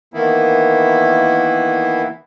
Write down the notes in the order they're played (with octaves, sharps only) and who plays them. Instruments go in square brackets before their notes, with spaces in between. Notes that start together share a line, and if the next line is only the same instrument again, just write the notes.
[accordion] D#3 E3 A#3 B3 E4